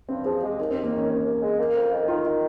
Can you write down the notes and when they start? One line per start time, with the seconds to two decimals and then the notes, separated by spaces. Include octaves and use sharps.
0.09 G2 C4
0.25 F3 G#4
0.42 G#3 G4
0.59 D#2 D#4
0.71 C4
0.75 D#2
0.83 A#3
0.92 D#3 C#4
1.09 D#2
1.25 D#2
1.42 G#3
1.59 A#3
1.75 F2
1.91 D#3
2.08 D#3 F4
2.25 D#3 D#4